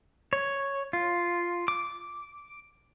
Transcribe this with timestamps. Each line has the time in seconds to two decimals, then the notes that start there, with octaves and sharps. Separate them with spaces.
0.33 C#5
0.93 F4
1.68 D6